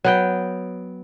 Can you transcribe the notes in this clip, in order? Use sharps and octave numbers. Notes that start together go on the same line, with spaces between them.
F#3 B3 G5